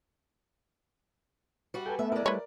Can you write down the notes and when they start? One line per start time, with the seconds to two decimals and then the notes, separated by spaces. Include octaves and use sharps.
1.74 G3 F#4
1.86 A4 B4 G5 G#5
1.99 A3 B3 E5
2.12 G#3 E4 A#4 D5
2.26 G3 A3 B4 C#5